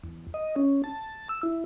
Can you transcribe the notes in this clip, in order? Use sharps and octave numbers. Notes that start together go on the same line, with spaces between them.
E2
D#5
C#4
A5
E6
E4